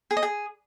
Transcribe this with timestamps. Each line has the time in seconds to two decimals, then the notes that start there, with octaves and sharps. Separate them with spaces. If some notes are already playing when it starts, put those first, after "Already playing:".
0.11 G#4
0.17 D#5
0.23 G#4